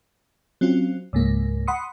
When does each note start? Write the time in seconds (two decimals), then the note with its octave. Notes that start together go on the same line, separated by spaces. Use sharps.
0.61 F#3 C4 C#4 F4
1.13 C#2 G#2 A#3
1.67 F#5 B5 C6 D#6 C#7